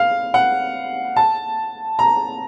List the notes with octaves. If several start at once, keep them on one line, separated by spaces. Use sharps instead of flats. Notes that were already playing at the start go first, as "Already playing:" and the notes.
Already playing: F5
F#5
A5
A#5